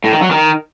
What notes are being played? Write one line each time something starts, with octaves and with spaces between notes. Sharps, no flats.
A2
D#3
F#3
D#3